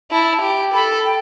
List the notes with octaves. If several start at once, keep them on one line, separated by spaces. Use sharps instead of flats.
E4 A5
G4
A4 B5
G5